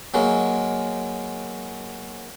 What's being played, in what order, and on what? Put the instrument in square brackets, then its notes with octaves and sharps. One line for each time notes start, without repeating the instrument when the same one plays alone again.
[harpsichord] F#3 G#3 A#3